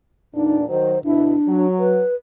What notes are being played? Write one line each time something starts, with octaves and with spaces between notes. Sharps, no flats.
E2 A#2 D4 D#4
D#3 F#3 C5
D2 B2 D4 E4
F#3
B4